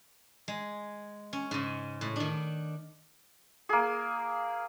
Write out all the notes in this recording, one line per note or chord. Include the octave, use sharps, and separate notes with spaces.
G#3
C#4
G#2 C#3
A2
D#3 D4
A#3 G#4